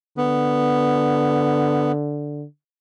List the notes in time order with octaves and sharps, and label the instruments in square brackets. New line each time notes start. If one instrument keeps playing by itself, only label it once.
[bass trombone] D3 [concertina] B3